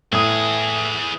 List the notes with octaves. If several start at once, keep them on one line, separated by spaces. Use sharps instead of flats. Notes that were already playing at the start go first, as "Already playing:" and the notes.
A2 E3 G#4 D#6